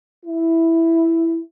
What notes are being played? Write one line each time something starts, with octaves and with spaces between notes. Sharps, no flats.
E4